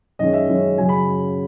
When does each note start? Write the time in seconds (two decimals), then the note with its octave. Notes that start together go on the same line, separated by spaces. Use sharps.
0.19 F#2 D#3 G#3 C#4 D#5
0.33 E5
0.49 F#2 D#3 G#3 C#4
0.78 F#2 C#3 F#3 G#5
0.89 B5